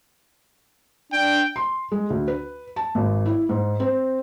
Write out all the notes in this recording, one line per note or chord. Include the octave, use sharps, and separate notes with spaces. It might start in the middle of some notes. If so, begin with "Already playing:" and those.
D4 G5
C6
G#3
D2
B4
A5
G#1
E4
G#2
C4